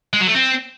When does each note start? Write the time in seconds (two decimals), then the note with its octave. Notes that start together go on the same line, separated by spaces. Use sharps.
0.13 G#3
0.20 F#3
0.28 A3
0.35 C4